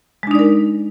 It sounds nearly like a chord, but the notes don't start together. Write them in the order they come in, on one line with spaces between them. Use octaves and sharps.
G#3 D4 D#4 D5 A#4